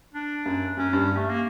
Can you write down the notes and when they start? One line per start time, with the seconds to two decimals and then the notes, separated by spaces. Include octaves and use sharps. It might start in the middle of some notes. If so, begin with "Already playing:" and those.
0.14 D4
0.46 F#2
0.77 F#2 C#4
0.93 G2
1.17 A3
1.29 A#3